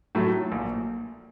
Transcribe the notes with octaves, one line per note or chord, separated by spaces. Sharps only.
A2 F#3 A3
A#1